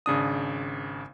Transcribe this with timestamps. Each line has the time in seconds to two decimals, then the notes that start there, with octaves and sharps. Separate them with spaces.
0.06 G#1 C#3 D4 D#6